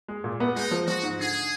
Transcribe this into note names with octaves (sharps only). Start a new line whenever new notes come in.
G#3
A#2
B3
G#3 D#4
F3
F3 F#4
G#2
D3 G#4